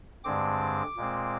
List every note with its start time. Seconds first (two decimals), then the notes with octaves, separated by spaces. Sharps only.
0.24 G2 D3 G#3 C4 D6
0.97 A#2 G#3 C4